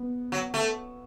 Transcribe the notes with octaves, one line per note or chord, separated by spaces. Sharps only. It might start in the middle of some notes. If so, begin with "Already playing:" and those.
Already playing: B3
F#3
A3